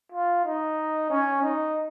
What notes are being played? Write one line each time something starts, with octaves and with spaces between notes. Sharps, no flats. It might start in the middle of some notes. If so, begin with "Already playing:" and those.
F4
D#4
C#4
D#4